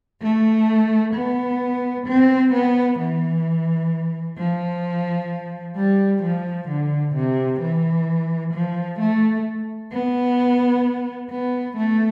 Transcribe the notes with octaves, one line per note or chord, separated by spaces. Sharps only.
A3
B3
C4
B3
E3
F3
G3
F3
D3
C3
E3
F3
A3
B3
B3
A3